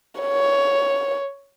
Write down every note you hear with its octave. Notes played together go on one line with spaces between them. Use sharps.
C#5